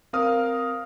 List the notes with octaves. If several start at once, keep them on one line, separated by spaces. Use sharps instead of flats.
C4 A#4 F5 D#6 F6